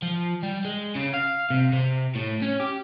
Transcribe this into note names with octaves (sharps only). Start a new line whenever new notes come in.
F3
G3
G#3
C#3
F5
C3
C3
A2
C#4
G4